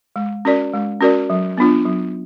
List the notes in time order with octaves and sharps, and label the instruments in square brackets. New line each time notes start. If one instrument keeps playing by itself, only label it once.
[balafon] G#3
C#4 F#4 A#4 D5
G#3
C#4 F#4 A#4 D5
F#3
B3 D4 F4
F#3